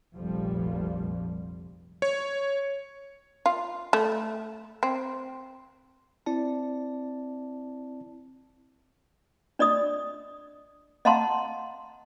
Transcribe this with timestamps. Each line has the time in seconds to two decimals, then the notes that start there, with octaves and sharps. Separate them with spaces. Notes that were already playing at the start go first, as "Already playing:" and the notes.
0.14 F1 A#1 F2 F3 G3
2.02 C#5
3.46 F4
3.93 A3
4.83 C4
6.26 C4 E4 D5 A5
9.59 D4 D5 D#5 D#6
11.05 D#5 F5 F#5 A5 A#5 C6